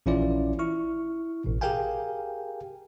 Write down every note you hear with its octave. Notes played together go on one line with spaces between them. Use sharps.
A#1 E3 C#4 E4 F4 D5
E4 C#6 F6
A1 B2
G4 G#4 A#4 F5 G5 G#5